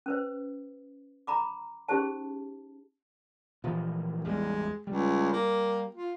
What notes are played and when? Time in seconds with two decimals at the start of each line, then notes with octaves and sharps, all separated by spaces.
0.06 C#4 B4 C5
1.27 A#5 B5 D6
1.88 C#4 D#4 G4 G#4 C5 A5
3.64 A#2 E3 F3
4.25 A1 E2 G3 G#3
4.87 C#2 G3
5.33 A#3
5.95 F4